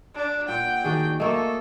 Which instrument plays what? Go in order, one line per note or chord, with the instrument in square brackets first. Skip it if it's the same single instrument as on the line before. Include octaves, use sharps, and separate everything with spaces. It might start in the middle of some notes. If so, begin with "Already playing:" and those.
[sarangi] D4
[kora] A#2 [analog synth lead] F#5 [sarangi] G5
[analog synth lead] D#3 [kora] D4 F#4 G#4
[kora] A3 A#3 C#5 [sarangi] A4 [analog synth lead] D#5